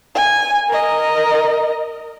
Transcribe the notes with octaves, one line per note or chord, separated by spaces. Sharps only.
G#5
A#4 D#5